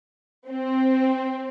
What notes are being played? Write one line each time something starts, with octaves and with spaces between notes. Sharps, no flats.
C4